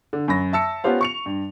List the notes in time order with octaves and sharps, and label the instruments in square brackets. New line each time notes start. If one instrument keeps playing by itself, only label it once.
[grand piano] D3
F#2 B5 A#6
E5 A5 E6 C#7
B3 C#4 F4 G4 C5 F5
C#6 C#7 F7
G2